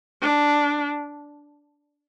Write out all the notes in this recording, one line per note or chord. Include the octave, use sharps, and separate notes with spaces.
D4